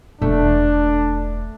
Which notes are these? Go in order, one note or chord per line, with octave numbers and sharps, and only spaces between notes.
E1 A3 D4